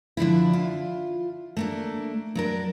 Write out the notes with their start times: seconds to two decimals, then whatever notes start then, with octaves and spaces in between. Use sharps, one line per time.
0.17 D3 F3 D4 E4
0.53 F4
1.57 A3 A#3 D4
2.35 F#3 D4 A#4